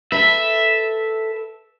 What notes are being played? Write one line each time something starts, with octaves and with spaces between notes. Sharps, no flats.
A4 B4 E5